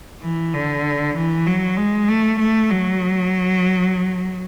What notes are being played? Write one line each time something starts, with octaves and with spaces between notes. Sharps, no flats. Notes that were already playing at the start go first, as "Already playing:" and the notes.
E3
D3
E3
F#3
G#3
A3
A3
F#3